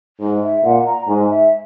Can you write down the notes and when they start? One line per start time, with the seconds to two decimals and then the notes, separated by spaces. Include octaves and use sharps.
0.21 G#2
0.43 E5
0.64 A#2 F#5
0.86 A#5
1.08 G#2 G#5
1.31 E5